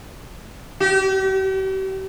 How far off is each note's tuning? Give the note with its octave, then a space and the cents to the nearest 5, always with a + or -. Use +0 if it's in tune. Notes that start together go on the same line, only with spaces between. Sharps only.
G4 -40